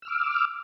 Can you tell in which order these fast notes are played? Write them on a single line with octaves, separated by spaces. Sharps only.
E6 F6 D6